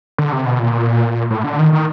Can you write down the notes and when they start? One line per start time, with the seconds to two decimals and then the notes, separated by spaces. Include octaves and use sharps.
0.18 D3
0.32 C3
0.46 B2
0.59 A#2
1.31 A2
1.44 D3
1.59 D#3
1.73 D#3